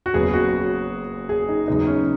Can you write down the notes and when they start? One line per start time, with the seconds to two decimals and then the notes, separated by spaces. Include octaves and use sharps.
0.06 F#4
0.14 F#1 F#2 C#3 B3 G#4
0.33 F#4
1.29 G#4
1.48 D#4
1.67 F#2 C#3 G#3 B3 D#4
1.87 C#4